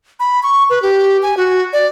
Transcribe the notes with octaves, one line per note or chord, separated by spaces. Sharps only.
B5
C#6
B4
G4
G#5
F#4
D5